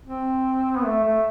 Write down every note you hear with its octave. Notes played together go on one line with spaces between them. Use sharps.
C4
B3
A3
A3